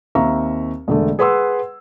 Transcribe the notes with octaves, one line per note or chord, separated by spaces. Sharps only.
D#2 C4 E5 F5 A#5 C#6
E1 D3 A3
G#4 B4 F#5 C6 E6